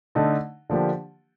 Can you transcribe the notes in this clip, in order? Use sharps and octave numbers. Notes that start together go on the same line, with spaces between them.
D3 A3 D#4
D3 F3 A#3 D4 G4